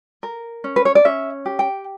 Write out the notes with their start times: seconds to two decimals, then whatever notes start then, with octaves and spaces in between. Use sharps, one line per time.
0.23 A#4
0.64 C#4
0.76 B4
0.85 C#5
0.95 D5
1.05 C#4 E5
1.46 G4
1.59 G5